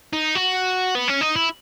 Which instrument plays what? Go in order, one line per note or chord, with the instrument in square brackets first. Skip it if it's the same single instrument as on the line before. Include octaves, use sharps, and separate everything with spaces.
[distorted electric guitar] D#4
F#4
B3
C#4
D#4
E4